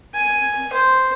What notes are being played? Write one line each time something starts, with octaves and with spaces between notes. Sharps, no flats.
G#5
C5